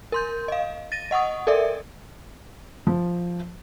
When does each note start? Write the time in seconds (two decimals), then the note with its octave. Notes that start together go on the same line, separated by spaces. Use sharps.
0.12 A#4 C6 G6
0.48 D#5 F5
0.92 A6 A#6 D#7
1.11 D#5 F#5 C#6 D#6
1.47 A4 A#4 D5 E5
2.87 F3